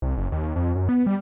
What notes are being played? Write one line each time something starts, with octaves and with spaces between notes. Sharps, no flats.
C2
F#1
D#2
F2
F#2
B3
G3